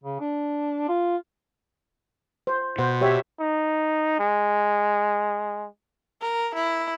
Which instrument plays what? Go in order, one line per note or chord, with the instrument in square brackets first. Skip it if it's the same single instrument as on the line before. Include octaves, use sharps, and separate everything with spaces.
[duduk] C#3
D4
F4
[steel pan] C5
[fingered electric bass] B2 [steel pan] C5 F#5
[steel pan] G4 C#5 E5
[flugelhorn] D#4
G#3
[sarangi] A#4
E4